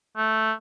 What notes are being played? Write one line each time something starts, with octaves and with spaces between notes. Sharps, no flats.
A3